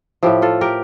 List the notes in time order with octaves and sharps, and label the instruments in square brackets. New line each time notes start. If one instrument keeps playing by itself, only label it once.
[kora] A2 F3 E4 G4
F4 A4
G4 A#4